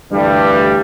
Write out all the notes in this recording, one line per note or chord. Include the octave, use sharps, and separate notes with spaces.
D2 G2 E3 G3